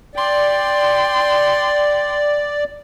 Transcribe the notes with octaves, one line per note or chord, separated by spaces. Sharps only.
D5 G5 C6